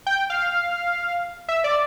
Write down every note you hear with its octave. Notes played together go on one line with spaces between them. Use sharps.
G5
F5
E5
D5